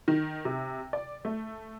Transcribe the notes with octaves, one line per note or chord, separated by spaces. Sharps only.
D#3
C3
D5
A3